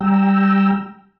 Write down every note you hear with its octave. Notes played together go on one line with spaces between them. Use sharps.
G3 G5 A#5 E6